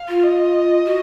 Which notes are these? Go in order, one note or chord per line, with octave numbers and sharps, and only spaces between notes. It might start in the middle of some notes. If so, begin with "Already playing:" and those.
Already playing: F5
F4
D#5
F#4